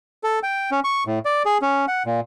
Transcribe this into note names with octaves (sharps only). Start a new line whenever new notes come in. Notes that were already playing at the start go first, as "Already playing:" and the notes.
A4
G5
C#4
C#6
A2
D5
G#4
C#4
F#5
A#2